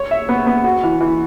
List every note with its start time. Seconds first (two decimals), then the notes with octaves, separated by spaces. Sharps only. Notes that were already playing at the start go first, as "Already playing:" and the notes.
Already playing: C#5
0.11 E5
0.29 B3
0.47 B3
0.64 F#4
0.83 E3
1.01 E3